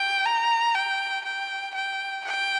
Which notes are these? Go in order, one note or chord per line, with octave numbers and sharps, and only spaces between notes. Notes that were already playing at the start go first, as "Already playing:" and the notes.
Already playing: G5
A#5
G5
G5
G5
G5